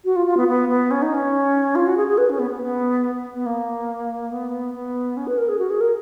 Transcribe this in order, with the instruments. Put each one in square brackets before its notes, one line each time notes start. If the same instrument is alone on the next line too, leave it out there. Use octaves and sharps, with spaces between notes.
[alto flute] F#4
F4
F4
B3
B3
B3
C#4
D#4
C#4
F4
F#4
G#4
G#4
B4
C#4
B3
B3
B3
B3
A#3
B3
B3
C#4
B4
A#4
G#4
F#4
G#4
A#4